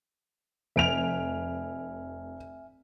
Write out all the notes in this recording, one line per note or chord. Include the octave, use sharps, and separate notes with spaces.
F1 E5 G#5 F6 D7 F7